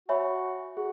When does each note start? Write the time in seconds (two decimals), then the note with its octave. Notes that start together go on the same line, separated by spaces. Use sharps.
0.08 F#4 C#5 E5 G#5 B5
0.76 F#4 G#4